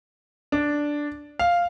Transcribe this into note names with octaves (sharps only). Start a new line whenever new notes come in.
D4
F5